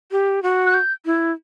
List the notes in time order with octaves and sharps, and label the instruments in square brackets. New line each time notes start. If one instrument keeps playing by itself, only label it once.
[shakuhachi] G4
F#4
[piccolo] F#6
G6
[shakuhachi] E4